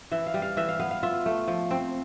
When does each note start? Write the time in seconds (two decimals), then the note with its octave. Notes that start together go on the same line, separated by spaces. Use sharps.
0.11 E3 E5
0.26 F5
0.34 G3
0.42 F5
0.57 E3 E5
0.69 F5
0.80 B3 F5
0.91 F5
1.03 F4 E5
1.26 A3
1.48 F3
1.71 C4